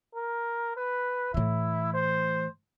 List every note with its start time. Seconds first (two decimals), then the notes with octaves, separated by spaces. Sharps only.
0.15 A#4
0.77 B4
1.34 A2 E3 E4
1.94 C5